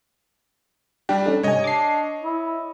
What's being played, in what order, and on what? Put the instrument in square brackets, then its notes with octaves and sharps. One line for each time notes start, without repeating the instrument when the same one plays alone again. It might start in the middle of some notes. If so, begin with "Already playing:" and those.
[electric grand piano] G3 D4 [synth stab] G4
[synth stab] C#4 D#4 A4
[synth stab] G#2 G#5 [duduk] C3 [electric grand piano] C#5 D#5
[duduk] D4 [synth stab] D6 C7
[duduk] E4